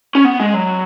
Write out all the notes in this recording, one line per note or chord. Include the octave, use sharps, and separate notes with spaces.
C#4
B3
G#3
F#3